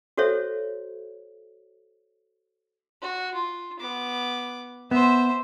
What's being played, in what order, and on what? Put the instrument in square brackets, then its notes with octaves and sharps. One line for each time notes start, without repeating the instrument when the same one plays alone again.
[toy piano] F#4 A4 C5 C#5 E5
[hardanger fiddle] F#4
F4
B3 D6
[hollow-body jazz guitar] B3 [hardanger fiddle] C5 E5